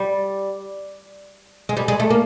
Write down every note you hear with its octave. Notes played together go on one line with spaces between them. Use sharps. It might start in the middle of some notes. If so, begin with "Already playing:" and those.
Already playing: G3
G#3
G3
G#3
A3
A#3